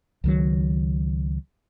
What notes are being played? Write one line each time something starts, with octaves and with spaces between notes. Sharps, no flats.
C#2 D#3 F#3